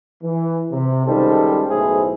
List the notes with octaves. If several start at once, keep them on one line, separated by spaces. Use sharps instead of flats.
E3
C3
C#2 D#3 G3 A4 C5
B1 A2 E4 G#4 C5